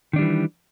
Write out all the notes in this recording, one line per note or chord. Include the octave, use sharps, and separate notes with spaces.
D#3 E3 G3 D4